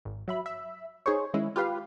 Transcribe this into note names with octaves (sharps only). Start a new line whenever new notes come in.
G#1
F#3 E5 B5
E5
D#4 G#4 C5 C#5
D#3 G#3 C#4 E4
F4 G4 B4 F5